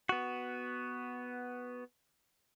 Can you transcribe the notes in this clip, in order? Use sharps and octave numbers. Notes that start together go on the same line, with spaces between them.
B3 F#4